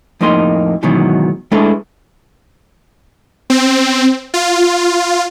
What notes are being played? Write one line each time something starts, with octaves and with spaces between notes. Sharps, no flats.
F2 A2 A#3 D#4 C6
G#2 B2 D#3 E3 F#3
G#3 A3 D4 E4 A4 B4
C4
F4